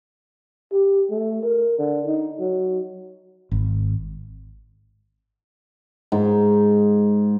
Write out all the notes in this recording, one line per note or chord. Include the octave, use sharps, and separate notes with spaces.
G4
A3
A#4
D3
D#4
F#3
G#1
G#2